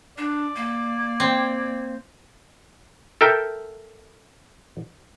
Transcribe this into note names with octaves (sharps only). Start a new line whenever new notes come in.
D4 D5
A#3
C4
A4 A#4 E5 G5